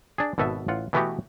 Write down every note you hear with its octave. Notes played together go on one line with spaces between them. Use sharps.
D4 G#4
G#1 B2 A4 B4 E5
A1 F4 F#5
B2 E3 A3 B3 F#4 G4